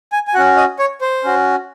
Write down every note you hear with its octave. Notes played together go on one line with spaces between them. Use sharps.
G#5
G#5
C#4 F#4 F#5
D#5
C#5
C5
C#4 F#4